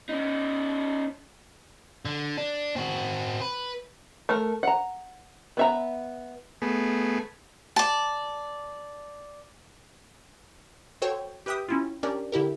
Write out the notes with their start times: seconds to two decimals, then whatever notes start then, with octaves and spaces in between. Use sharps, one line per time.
0.09 C#4 D#4
2.05 D3
2.38 D4
2.76 C4 F#4
3.42 B4
4.29 A3 A#4
4.63 F#5 A#5
5.57 B3 E5 A#5
6.62 A3 B3 G#4
7.76 D5 A5
11.02 F#4 A4 C5 C#5 G5
11.46 G4 B4 E5 G5 D#6
11.69 C#4 E4 F4
12.03 C#4 D4 G4 A#4 D5
12.32 D3 E4 G4 A#4